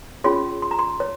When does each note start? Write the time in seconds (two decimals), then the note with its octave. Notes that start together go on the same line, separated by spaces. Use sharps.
0.24 C#4 F4 G#4 C#5 C6
0.62 C6
0.71 A#5
0.79 C6
1.00 C#5